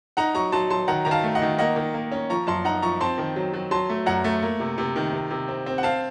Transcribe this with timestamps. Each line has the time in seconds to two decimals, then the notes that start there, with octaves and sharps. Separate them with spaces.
0.17 D#4 F#5 A#5
0.35 F#3 A#5 C#6
0.52 F#3 A5 C6
0.70 F#3 A5 C6
0.88 D#3 F#5 A#5
1.05 D#3 A#5
1.11 F5 A5
1.23 A3
1.35 D#5 F#5
1.42 D#3
1.58 A#3 D#5 F#5
1.76 D#3
1.94 A#3
2.11 C#4
2.30 F3 A#5 C#6
2.47 F#2 A5 C6
2.65 D#4 F#5 A#5
2.82 F3 A#5 C#6
3.00 C4 A5 C6
3.18 D#3
3.36 F#3
3.54 F#3
3.71 F#3 A5 C6
3.89 A3
4.06 F#2 F#5 A#5
4.24 A3
4.43 A#3
4.60 C3
4.78 C3
4.96 D#3
5.13 C3
5.30 C3
5.48 C4
5.66 C4
5.78 F#5
5.83 C4 F5 A5